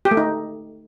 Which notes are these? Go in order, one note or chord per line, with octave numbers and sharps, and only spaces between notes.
G4
A3
D#4